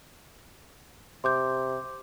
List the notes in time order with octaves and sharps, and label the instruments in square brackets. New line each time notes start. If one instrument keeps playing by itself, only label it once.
[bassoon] C3 [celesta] C6 D6 G6